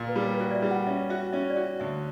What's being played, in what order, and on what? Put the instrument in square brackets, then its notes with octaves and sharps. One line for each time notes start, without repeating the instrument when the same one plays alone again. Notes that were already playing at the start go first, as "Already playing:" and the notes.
Already playing: [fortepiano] A#2
[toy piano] B4
[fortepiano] G3
[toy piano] C#5
B4
[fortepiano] F#4 [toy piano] C#5
[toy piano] D5
E5
[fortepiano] G3
[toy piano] F#5
[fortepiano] C#4 [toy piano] E5
[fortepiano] F#4 [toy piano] E5
[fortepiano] C#4 [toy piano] E5
[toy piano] D5
[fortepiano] F#4 [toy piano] E5
[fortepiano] D2 [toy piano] E5